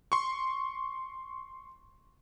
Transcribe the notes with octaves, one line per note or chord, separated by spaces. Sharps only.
C6 C#6